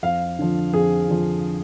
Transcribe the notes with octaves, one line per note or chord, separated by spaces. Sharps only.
F2 F5
D3 F3
F2 G#4
D3 F3